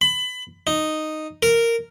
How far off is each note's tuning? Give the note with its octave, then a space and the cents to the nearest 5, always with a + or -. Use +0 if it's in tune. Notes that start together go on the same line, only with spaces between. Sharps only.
B5 +25
D#4 -5
A#4 -10